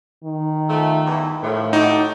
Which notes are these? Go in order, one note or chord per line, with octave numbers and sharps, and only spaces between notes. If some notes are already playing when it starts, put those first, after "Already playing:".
D#3
F3 A3
E2 G2 E3
A2 D#3 F3 A3
A3 D#4 F#4 G4